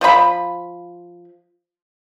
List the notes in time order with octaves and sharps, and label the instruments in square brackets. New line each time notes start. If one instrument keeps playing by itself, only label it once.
[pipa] F3 F4 G#4 B5